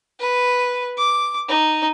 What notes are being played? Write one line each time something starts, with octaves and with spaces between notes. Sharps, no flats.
B4
D6
D#4